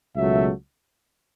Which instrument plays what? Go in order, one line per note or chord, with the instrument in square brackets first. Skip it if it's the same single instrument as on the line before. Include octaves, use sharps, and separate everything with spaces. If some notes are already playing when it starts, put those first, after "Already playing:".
[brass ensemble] C#2 B2 F#3 A3 E5